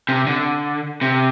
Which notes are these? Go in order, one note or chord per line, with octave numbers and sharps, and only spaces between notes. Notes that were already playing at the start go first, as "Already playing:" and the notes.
C3
D3
C3